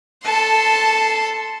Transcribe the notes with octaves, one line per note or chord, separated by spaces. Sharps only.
A4 A5 C6